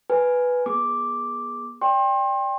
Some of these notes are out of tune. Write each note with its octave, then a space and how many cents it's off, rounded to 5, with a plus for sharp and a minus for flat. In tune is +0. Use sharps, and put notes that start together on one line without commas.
B4 +0 G#5 +0
B3 -35 G#4 +0 D6 +0
D5 +0 G5 +20 C6 +35